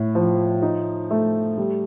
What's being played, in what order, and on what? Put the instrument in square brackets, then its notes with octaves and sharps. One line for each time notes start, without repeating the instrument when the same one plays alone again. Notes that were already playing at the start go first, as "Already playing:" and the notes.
Already playing: [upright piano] A2
F3
D#4
A3
G3